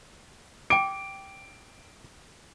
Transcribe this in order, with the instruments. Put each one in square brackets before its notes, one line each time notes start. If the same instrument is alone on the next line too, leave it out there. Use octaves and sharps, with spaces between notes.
[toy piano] G5 D6 [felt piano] D7